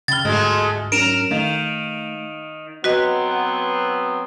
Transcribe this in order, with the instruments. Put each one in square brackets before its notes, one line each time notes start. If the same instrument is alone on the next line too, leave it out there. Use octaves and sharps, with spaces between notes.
[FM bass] C#3 [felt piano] G5 B5 F6 [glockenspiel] A6 G7
[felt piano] G1 D2 [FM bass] G#2 [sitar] G#3 A3 F#4
[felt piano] F#3 C#4 D4 [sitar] A#4 [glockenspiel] D7 E7 F7
[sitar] D#3 [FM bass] A3 [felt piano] F5
[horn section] F#3 B3 C4 [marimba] F#4 B4 D#5